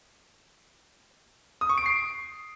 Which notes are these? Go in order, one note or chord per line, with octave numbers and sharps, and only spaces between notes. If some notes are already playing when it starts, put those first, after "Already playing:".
D#6
C#6
D7
C7